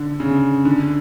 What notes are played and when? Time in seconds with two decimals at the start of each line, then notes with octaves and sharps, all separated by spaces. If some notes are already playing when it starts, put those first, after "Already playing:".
Already playing: D3
0.20 C#3
0.65 D3